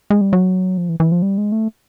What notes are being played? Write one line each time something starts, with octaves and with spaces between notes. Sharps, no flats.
G#3
G3
F#3
F3
E3
E3
F3
G3
G#3
A3